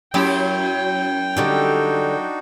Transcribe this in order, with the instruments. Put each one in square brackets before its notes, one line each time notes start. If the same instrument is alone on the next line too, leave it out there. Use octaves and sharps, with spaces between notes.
[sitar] F#2 E4 [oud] F#3 G4 [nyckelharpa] G5
[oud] D3 G3 G4 [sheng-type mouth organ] D4 D#4 F#4